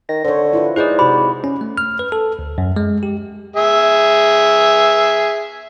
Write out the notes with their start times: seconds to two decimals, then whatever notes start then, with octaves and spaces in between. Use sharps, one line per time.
0.09 D#3 A#6
0.24 D3 C5 C#5
0.53 E4 F4 B4
0.76 G#2 E4 G#4 B4 C5 D5 D#5
0.99 C3 F#4 G4 B5
1.44 C#4
1.61 A3
1.77 F6
1.99 B4
2.12 A4
2.39 D2
2.58 F#2
2.76 G#3
3.03 G4
3.56 G#4 E5